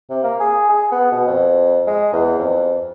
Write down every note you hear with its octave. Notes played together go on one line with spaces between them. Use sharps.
C3
A#3
G#4
G#4
B3
B2
F2
G#3
E2
F2